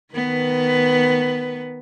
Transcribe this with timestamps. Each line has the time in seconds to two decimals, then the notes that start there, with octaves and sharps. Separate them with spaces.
0.14 D#3 B3 B4